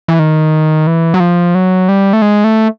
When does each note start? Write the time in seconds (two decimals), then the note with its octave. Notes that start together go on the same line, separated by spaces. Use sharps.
0.08 E3
0.19 D#3
0.87 E3
1.14 F#3
1.20 F3
1.55 F#3
1.89 G3
2.13 A3
2.22 G#3
2.44 A3